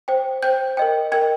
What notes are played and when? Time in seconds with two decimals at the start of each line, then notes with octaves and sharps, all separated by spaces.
0.08 C5 G5
0.43 C5 G5 G6
0.77 A#4 D#5 G5
1.12 A#4 D#5 G5 G#6